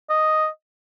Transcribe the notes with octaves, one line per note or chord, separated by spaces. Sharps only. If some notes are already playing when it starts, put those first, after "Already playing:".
D#5